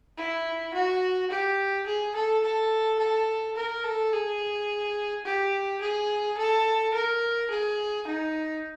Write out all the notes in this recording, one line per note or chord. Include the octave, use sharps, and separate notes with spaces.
E4
F#4
G4
G#4
A4
A4
A4
A#4
A4
G#4
G4
G#4
A4
A#4
G#4
D#4